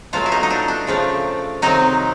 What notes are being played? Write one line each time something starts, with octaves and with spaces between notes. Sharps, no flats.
B2 F#3 A3 F4
E4
D#4
D#4
D4
D4
C#3 F3 A3
C3 D#3 F#3 D#4